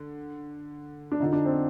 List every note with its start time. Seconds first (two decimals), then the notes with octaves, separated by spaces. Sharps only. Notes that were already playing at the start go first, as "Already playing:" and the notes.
Already playing: D3
1.12 D4
1.20 F2 D3 F3 D#4
1.33 D4
1.46 C4